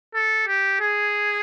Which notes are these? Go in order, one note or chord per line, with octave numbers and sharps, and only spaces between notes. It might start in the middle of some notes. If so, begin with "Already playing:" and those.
A4
G4
G#4